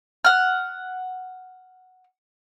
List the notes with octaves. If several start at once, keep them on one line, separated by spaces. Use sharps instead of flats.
F#5 F6